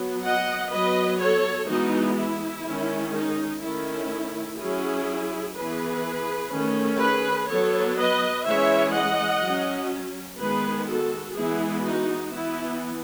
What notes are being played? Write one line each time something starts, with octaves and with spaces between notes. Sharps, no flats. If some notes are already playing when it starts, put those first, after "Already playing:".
Already playing: F#3 B3
D#5 F#5
F#3 B3 B4 D#5
A4 C#5
E3 G#3 B3 D#4 F#4
E4
D#3 G#3 C#4
D#4
D#3 A3 C#4 E4
F#3 C#4 E4 G#4
E3 B3 G#4 B4
D#3 A3 C#4
G#4 B4
F#3 B3 A4 C#5
B4 D#5
E3 G#3 C#4 C#5 E5
D#5 F#5
F#3 C#4
D#3 G#3 B3 G#4 B4
F#4 A4
E3 G#3 B3 E4 G#4
D#4 F#4
E3 B3 E4